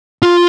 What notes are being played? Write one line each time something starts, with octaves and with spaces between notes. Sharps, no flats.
F4